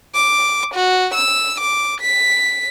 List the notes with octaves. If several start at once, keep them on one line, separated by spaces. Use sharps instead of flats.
D6
F#4
E6
D6
B6